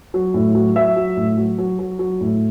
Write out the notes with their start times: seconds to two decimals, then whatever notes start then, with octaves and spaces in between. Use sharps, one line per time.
0.14 F#3
0.34 A2
0.55 F#3
0.76 F#3 E5
0.96 F#3
1.17 A2
1.37 F#3
1.58 F#3
1.79 F#3
1.99 F#3
2.21 A2